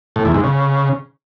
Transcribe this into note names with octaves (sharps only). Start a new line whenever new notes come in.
A2
E2
G#2
C#3